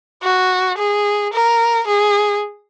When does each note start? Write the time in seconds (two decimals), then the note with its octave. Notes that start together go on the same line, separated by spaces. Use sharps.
0.23 F#4
0.78 G#4
1.33 A#4
1.87 G#4